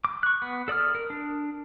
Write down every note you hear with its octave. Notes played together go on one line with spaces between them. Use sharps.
D6
C#6 F#6
B3
A4 D5 D#6 F6
A#4
D4